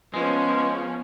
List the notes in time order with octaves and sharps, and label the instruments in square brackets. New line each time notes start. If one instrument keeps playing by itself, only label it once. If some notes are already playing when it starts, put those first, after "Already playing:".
[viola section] F3 B3 C#4 [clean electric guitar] G#3